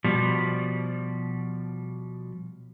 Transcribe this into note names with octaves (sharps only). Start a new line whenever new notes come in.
B2 F3 G3